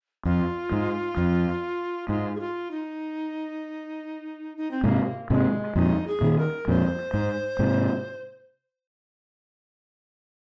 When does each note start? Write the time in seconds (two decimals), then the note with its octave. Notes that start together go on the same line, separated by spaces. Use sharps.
0.25 F2 F4
0.72 G#2
1.17 F2
2.09 G#2 F4
2.35 G#4
2.39 F4
2.70 D#4
4.57 D#4
4.71 C4
4.83 G#2 C3 A#3
5.30 G#2 C3 G#3
5.75 F2 A#2 D#4
6.07 G#4
6.21 A#2 D#3
6.37 A#4
6.68 F2 A#2 C5
7.14 G#2
7.59 G#2 C3